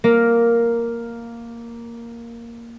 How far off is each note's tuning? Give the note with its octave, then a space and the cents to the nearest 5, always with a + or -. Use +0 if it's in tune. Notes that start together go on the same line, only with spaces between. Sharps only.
A#3 +0 A#4 +0